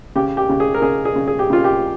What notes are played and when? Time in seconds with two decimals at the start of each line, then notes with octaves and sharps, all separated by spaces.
0.16 C#3 G4
0.37 G4
0.49 C#3
0.60 G#4
0.74 A#4
0.82 C#3 G#4
1.05 G#4
1.16 C#3
1.28 G#4
1.39 G4
1.50 C#3 F4
1.64 G4